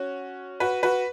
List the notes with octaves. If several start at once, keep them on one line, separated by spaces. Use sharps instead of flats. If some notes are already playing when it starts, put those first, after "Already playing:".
Already playing: C#4 F#4
F#4 B4
F#4 B4